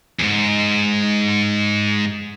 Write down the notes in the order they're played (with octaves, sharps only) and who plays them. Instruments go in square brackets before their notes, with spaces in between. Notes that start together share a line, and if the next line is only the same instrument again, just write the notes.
[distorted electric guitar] E2 G#2